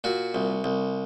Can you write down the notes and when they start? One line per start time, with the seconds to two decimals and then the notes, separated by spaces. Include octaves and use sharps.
0.04 A#2 F#4
0.35 C2
0.64 C2